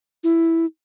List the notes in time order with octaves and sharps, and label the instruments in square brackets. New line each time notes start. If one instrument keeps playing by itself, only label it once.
[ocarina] E4